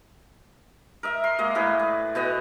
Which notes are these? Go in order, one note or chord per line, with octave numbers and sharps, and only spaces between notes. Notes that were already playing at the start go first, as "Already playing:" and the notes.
A#4 D#5 E5
C6
G#3 A#3 D#5
A2 G#4 B4
D5
B2 B3 D#5